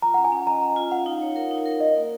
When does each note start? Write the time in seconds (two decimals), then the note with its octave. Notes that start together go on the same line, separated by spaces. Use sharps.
0.02 F4 A#5
0.14 C#4 F#5
0.25 G#5
0.32 C#4
0.47 D#5 A#5
0.61 D#5
0.76 F4
0.91 F5 F#5
1.06 D#4
1.21 C#5
1.36 A#4
1.51 D#4
1.66 A#4
1.80 A#4 D#5
1.96 A#3